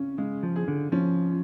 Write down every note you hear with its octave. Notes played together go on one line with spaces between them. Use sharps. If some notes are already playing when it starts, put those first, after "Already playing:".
Already playing: C#3 C#4
C#3 G#3
F3
G#4
D3
F3 C#4